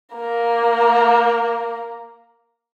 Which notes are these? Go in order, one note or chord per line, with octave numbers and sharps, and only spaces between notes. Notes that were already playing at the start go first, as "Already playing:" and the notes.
A#3 A#5